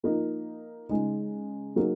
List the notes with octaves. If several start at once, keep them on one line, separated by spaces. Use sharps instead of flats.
F3 A#3 D#4
C#3 G#3 D#4
F#3 A#3 D#4 G#4